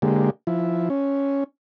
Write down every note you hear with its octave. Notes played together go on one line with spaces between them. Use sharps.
D3 G#3 A#3 G4
F3 E4
C#4